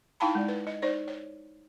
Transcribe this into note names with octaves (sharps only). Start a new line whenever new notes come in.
D#4 E4 F5 G5 A5 B5
G#3 D5
B4
D#5
D#4 C5 D5
C#5